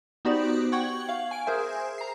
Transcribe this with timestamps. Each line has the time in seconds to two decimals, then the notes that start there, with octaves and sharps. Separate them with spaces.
0.25 B3 D#4 F#4 G4 C5 D5
0.72 F#5 G5 C#6 G#6 F#7
1.09 F5
1.31 G#5 D7
1.46 G#4 A#4 C5 E5 G#5
1.98 A#5 C7